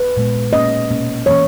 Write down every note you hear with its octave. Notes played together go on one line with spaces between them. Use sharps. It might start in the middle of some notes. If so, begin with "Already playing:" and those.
Already playing: B4
A#2 G#3 B3
B2 A#3 C#4 D#5
B2 A#3 C#4
E3 A#3 C#4 C#5